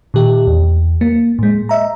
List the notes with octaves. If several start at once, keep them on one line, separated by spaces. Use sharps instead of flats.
A#2 D#3 G4
E2
A#3
A2 G#3
D#5 E5 A#5